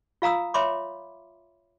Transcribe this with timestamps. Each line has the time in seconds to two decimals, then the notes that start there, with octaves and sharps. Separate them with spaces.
0.22 F4 F5 A#5 D#6 E6
0.54 C#5 E5 B5 C6 D6